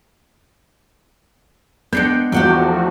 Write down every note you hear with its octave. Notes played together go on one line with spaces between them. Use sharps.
G#3 B3 D4 G5 G6 C7 C#7
E2 F3 A3 F#4 G4 F#5 G5